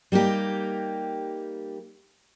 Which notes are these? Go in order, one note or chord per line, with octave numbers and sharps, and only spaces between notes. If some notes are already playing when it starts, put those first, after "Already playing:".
G3 A#3 D#4 G4